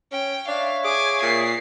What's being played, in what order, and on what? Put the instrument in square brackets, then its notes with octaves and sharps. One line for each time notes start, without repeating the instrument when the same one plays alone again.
[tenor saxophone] C#4 [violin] G5
[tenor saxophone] D4 [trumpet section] C#5 E5 [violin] F5
[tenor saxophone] G#4 [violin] G#5 D6
[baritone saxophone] A#2 [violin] C7